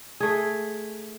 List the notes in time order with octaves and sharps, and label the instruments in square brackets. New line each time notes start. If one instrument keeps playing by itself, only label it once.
[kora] A3 G#4